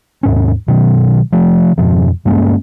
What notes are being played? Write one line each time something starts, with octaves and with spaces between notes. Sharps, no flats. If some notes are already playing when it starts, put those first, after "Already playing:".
D#2 G#2 C#4
B2 D#3 F#3
F3 A3
F2 G#2 B2 F3
G2 G#3 A#3 C#4